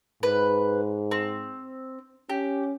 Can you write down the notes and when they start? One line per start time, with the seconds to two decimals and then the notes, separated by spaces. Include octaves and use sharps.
0.23 G#2 B4
1.11 C4
2.30 C#4 G4